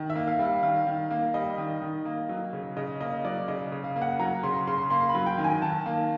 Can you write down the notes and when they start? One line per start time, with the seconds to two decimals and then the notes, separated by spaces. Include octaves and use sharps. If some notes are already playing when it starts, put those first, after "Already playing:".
Already playing: D#3
0.10 E5
0.16 A#3
0.27 F5
0.39 G3
0.45 F5
0.63 D#3 F5
0.87 D#3
1.11 A#3
1.34 G3 D#5
1.58 D#3
1.82 D#3
2.05 A#3
2.29 F#3
2.53 C#3
2.77 C#3 D#5
3.00 A#3 D#5
3.25 F#3 D5
3.48 C#3 D#5
3.72 C#3
3.84 F5
3.96 A#3
4.02 F#5
4.19 F#3 A#5
4.43 C#3 C6
4.67 C#3 C6
4.90 A#3 C6
5.09 B5
5.15 F#3
5.26 G5
5.38 D#3
5.44 G#5
5.62 D#3 A5
5.86 A#3